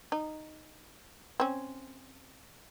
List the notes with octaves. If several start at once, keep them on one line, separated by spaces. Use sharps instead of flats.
D#4
C4 C#4